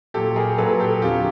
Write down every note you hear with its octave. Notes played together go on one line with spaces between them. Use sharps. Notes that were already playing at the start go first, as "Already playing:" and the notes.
A#2 F#3 G4 A4
G#4 A#4
A#2 F#3 A4 B4
G4 A4
F2 D3 F#3 F4 G4